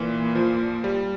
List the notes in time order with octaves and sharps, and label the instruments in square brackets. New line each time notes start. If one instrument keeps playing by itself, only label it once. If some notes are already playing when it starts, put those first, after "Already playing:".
Already playing: [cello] A#2 [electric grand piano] E3
[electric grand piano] F3
G3